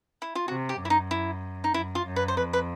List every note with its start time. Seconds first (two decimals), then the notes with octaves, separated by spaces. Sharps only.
0.22 E4
0.35 F4
0.48 C3 F#4
0.69 G4
0.80 F#2
0.85 E4
0.90 D#4
1.11 E4
1.64 D#4
1.74 F#2 E4
1.95 F4
2.06 F#2
2.16 B4
2.28 C5
2.37 F2 B4
2.53 B4